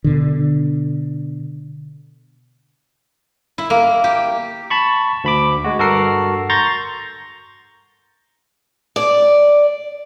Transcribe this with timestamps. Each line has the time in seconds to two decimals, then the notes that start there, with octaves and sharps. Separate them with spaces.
0.04 B2 D3
3.58 E4
3.70 A#3
4.04 G4
4.70 A5 B5 C#6
5.24 D2 B5 D6
5.64 G#3 F#4
5.79 G2 F#4 A4 A#4 C7
6.50 A#5 C6 C#6 G6 A6 A#6
8.96 D5